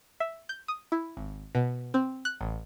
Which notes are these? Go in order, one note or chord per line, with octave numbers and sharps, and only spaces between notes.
E5
G6
D#6
E4
G#1
B2
C4
F#6
A1